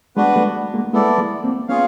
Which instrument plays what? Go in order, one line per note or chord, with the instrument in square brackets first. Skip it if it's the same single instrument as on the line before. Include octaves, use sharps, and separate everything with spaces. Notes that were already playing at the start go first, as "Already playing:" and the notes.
[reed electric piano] G#3 [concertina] B3 D4 F#4 B4
[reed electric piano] G3 A3
G#3 A#3
[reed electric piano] G#3 A#3 [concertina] B3 E4 A4 D5
[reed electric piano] G#3 A#3
A#3 C4
[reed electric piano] B3 C#4 [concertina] F4 G#4 C#5 F5